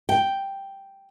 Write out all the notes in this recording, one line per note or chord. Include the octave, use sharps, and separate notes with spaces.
G5